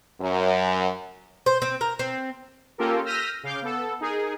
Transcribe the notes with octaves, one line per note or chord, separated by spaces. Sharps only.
F#2
C5
C4
A#4
C4
A#3 C#4 F4 G4 A4 A#4
E6 F6 G6 A#6 B6 D#7
C#3 F5 D6 G6
B3 A4
D#4 G#4 A#4